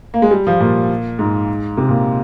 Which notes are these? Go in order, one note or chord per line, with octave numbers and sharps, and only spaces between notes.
A#3
G#3
G3
F3
A#2
G#2
C3
A#2